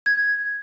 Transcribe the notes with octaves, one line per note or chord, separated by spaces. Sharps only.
G#6